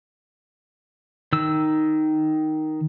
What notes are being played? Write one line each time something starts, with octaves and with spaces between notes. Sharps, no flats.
D#3 E6